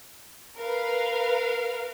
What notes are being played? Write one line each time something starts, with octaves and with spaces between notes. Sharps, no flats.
A#4 B4 F5